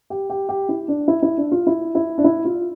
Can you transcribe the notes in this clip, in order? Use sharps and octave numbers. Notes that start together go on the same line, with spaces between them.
G4
G4
G4
E4
D4
E4
E4
D4
F4
E4
E4
D4
E4
F4